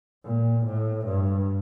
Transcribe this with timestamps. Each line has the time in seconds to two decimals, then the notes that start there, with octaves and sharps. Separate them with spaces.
0.25 A#2
0.66 A2
1.06 G2